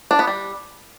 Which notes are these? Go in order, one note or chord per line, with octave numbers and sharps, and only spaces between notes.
D4
B3
G3